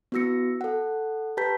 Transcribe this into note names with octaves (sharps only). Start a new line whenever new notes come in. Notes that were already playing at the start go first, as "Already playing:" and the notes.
B3 E4 F#4 E6 A#6 C#7
A4 F#5
G4 B4 A5 A#5 G6 B6